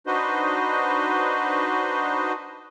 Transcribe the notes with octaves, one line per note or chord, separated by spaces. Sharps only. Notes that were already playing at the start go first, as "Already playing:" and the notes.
D4 D#4 F#4 B4 C5 D#5